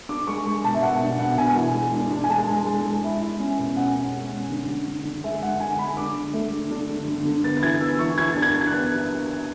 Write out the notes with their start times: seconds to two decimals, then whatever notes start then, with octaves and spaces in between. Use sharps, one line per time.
0.09 D4 D6
0.27 G#3 C#6
0.46 G#3
0.64 B2 A5
0.74 E5
0.82 B2 F#5
1.01 D4
1.19 B2 F#5
1.38 B2 G#5
1.56 E3
1.74 G#3
1.93 D4
2.11 D4
2.24 G#5
2.30 G#3 A5
2.48 G#3
2.66 G#3
2.85 G#3
3.03 E4
3.22 E4
3.40 C#4
3.59 B2
3.76 C#4 F#5
3.95 C#4
4.13 G#3
4.32 C#4
4.50 D3
4.69 D3
4.88 D3
5.05 D3
5.24 G#3 E5
5.42 D3 F#5
5.60 D3 G#5
5.79 G#3 B5
5.97 D4 D6
6.16 D3
6.34 A3
6.52 D3
6.71 D4
6.89 D3
7.08 D3
7.25 D3
7.44 B3 A6
7.57 A6
7.63 E3 G#6
7.81 B3 E6
7.99 E3 C#6
8.18 E3 G#6
8.32 D4 A6
8.42 G#6
8.54 D4
8.61 G#6
8.67 F#6
8.73 B3